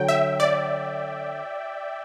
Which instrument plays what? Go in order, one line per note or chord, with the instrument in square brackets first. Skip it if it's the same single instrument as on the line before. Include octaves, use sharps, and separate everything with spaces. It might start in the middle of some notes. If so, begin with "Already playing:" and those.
Already playing: [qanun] D3 F#3 [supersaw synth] G5
[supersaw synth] E5
D5